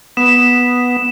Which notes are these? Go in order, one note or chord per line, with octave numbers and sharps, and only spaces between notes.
B3 E7